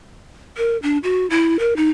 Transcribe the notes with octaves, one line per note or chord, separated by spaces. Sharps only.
A#4
D4
F#4
E4
A#4
D#4